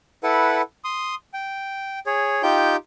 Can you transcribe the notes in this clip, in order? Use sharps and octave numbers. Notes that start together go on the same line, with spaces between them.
E4 A4 B4 F#5
C6 D#6
G5
G#4 C#5
D#4 F4 G4 G5 G6